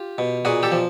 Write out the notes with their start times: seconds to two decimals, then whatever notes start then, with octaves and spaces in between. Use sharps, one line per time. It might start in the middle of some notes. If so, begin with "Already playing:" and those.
Already playing: F4 G4
0.18 B2
0.45 A#2 F#4 G#4
0.63 G4 A4
0.72 F3